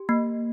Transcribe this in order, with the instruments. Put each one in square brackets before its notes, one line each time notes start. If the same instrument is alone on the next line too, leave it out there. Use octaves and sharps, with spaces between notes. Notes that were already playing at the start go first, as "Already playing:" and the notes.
Already playing: [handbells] G4
A#3